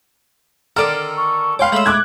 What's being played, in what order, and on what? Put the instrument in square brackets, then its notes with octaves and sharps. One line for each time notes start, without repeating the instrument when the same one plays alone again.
[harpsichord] D3 D#3 A#4 [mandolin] A4 D5 C6 [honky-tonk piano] F6
[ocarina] C#6
[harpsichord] B4 G5 D6 [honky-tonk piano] C#5 F5 [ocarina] C6
[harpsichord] G#3 A3 B5 [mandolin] E6 G6
[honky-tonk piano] D6 F#6 G#6